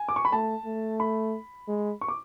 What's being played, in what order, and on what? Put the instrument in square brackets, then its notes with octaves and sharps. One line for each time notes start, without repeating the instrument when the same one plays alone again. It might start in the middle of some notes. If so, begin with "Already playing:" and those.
Already playing: [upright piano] G#5
D6
C#6
B5
[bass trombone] A3 [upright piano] A5
[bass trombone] A3
[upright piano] B5
[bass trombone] G#3
[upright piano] C#6
D6